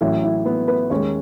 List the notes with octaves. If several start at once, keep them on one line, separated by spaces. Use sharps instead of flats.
A1 A2 F#3 A3 E4 E5
E4 E5
B3 B4
B3 B4
D#2 D#3 G#3 C#4 C#5